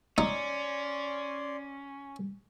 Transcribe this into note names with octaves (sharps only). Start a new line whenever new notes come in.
C#4 D#4 D5 C6